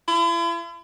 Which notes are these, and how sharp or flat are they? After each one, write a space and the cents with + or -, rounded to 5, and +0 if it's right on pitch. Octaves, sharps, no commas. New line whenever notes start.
E4 +45